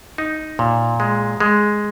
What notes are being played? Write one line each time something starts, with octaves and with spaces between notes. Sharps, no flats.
D#4
A#2
G#3
G#3